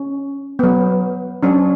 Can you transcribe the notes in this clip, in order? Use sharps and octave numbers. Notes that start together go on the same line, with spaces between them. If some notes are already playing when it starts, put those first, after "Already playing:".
Already playing: C#4
F#3 B3
F#3 C#4 D4